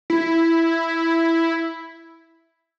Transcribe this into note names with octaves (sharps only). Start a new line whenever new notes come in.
E4